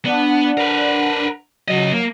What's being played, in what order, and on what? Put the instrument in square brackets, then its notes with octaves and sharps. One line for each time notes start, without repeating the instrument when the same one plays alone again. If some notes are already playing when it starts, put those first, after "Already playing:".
[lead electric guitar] B3 [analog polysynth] D4 F#5
[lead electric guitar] A#4 B4
[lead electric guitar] C#3 D#5 [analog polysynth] F#3
[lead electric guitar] A#3